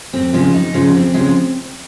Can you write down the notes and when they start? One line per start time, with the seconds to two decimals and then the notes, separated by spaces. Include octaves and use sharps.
0.13 F2 C4
0.33 C#3 F3 G#3
0.53 F2 D#4
0.74 C#3 F3 G#3
0.94 F2 C4
1.14 C#3 F3 G#3